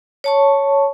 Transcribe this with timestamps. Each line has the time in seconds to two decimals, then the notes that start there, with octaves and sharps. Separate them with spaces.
0.24 C#5 A5 C#6